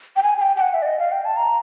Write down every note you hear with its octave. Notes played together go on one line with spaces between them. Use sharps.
G5
G#5
G#5
G5
G5
F#5
E5
D5
D#5
F5
G5
A5
A#5